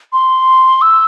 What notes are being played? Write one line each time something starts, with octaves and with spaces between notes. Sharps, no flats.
C6
E6